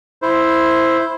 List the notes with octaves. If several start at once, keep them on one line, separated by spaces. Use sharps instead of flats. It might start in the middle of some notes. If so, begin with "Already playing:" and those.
E4 C5